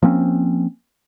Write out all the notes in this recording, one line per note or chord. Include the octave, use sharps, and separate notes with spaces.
F3 A#3 C4 C#4